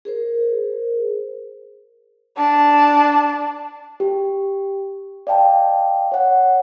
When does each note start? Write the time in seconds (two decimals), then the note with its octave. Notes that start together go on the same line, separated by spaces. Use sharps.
0.05 G#4 A#4 C5
2.37 D4 A5
4.00 G4
5.27 D5 D#5 F5 G5 A5
6.12 C#5 F#5